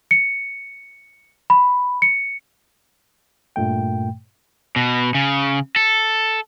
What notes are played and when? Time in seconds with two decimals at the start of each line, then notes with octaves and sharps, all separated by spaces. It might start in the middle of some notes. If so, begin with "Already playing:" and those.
0.11 C#7
1.50 B5
2.02 C#7
3.56 G2 A#2 A3 G5
4.76 B2
5.15 C#3
5.76 A4